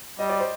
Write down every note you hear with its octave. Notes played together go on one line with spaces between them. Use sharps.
G3 D#5
D5
C5